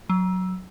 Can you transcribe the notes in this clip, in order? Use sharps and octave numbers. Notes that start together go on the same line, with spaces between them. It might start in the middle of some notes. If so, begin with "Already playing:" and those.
F#3